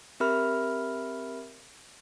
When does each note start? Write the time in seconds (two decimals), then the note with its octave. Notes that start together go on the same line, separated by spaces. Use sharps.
0.20 C4 G4 A#4 E5 B5 F6